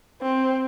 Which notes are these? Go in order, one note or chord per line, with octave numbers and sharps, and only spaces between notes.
C4